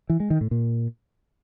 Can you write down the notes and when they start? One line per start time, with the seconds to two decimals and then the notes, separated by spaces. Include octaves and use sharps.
0.10 E3
0.20 G#3
0.30 D#3
0.41 A2
0.51 A#2